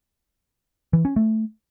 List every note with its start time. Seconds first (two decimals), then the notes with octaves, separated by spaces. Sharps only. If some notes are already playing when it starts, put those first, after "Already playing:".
0.93 E3
1.05 C#4
1.16 A3